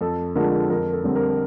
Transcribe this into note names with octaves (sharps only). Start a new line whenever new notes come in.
F2 A4
D3 F3 G#3 A#4
F2 A#4
A4
D3 G3 C4
A#4